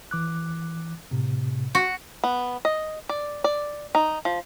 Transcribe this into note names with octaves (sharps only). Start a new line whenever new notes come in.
E3 D6 F#6
A2 C3
F#4
B3
D#5
D5
D5
D#4
F3